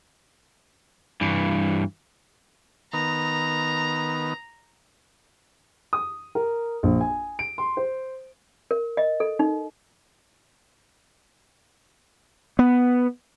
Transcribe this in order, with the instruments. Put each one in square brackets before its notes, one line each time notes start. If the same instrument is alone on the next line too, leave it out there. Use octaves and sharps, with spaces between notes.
[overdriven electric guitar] G2 E3
[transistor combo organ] D#3 B3 [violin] A#5
[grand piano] D#6
A#4
A#1
G#5
D7
C6
C5
[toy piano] A#4
D#5
A4
D#4
[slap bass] B3